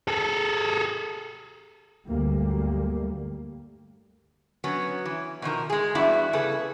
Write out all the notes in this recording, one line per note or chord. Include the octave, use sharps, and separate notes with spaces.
G#4 A4
D2 G2 F#3 G3 A#3
F#3 B3 C#4
E3
B2 D#3 F3 A#4
G#3 G#4
G2 E3 B3 D4 E4 F#4
C#3 B3 G#4 A4 B4